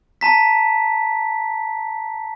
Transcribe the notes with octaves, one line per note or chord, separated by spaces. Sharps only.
A5 A#5 B6